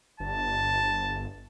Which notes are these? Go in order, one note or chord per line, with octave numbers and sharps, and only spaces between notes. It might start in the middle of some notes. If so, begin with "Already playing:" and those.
G1 A5